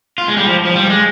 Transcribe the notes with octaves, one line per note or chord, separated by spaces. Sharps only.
F4
G#3
G3
F3
F3
G3
G#3